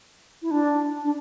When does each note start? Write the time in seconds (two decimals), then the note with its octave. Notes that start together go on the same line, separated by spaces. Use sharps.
0.42 E4
0.51 D4
1.05 D4